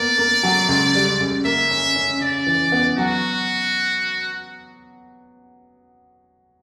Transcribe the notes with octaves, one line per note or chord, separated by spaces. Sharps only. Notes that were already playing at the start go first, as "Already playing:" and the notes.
Already playing: A#3 B3 D5
A#3
F#3
C#2
G3
C#2
A#3 E5
C#4
C#4
C#3 D5
E3
B3
F#3 F#4